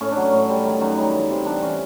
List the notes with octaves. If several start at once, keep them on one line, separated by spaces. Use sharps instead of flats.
A2 C#4
D4
F#3
C#4
A2
G3
D#3
F#2
G3 D#4
E3
C3
G3 D4
E3 C#4